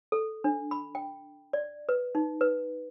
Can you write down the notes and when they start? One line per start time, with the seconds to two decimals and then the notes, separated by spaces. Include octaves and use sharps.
0.12 A4
0.44 D4
0.71 B5
0.95 G5
1.53 D5
1.89 B4
2.15 D#4
2.41 B4